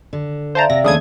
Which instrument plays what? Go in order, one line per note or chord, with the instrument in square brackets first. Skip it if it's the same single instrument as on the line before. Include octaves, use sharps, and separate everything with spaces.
[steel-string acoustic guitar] D3
[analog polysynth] C5 A5 A#5 [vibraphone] D5 E5 F5
[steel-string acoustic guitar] C3 [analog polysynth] A#6
[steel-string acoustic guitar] D#2 A3 D4 [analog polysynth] C#3 D#6 G#6